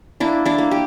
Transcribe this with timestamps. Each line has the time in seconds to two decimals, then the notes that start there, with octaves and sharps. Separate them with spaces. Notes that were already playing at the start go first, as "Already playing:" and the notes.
0.20 A#3 D4 E4
0.45 D4 E4
0.58 A#3
0.71 G4